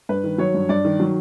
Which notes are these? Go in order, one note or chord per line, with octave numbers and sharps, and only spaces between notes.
G2 B4
D#3
F#3 C#5
G2
G2 D5
D#3
F#3